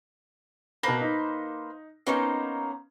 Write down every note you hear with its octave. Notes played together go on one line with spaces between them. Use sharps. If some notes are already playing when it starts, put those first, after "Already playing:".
B2 A#3 B4 C5 A#6
D#4
A#3 B3 C#4 D#4 C5